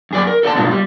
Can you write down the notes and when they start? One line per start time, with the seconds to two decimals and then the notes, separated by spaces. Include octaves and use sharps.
0.11 F#2 G#4 D5
0.27 A#4
0.43 A4 D5 E5 A5
0.56 G2 B2 G#3 F4
0.71 G3